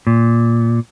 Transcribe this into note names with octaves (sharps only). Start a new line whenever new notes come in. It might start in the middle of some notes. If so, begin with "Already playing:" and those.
A#2